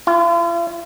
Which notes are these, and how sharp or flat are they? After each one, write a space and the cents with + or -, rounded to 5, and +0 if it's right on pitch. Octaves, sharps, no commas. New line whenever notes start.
F4 -45